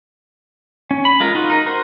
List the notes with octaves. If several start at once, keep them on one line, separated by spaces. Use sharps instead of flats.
C#4
B5
G#3 F4 A#4
D#4 F4 F#4
D#4 A#4
F#4 A#4 C5